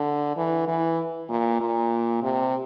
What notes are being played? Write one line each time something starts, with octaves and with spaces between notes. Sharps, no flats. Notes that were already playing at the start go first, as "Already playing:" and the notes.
Already playing: D3
E3
E3
A#2
A#2
C3